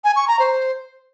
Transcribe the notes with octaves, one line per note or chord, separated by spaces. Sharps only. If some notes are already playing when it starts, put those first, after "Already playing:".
G#5
C#6
A#5
C5